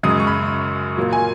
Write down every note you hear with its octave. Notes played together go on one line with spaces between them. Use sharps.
F#2 C#3 G#3 D#6
C#6
B5
A#2 F#3 A#3
G#5